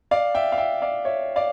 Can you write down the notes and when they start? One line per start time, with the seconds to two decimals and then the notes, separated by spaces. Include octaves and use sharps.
0.11 D5 F5
0.35 E5 G5
0.52 F5
0.58 E5 G5
0.82 D5 F5
1.05 C#5 E5
1.36 D5 F5